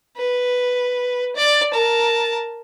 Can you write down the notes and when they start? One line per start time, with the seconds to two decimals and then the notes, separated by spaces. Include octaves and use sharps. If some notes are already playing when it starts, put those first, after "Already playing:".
0.17 B4
1.36 D5
1.73 A#4 A5